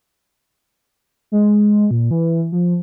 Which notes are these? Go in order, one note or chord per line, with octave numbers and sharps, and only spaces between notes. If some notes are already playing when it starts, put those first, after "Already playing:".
G#3
A#2
E3
F3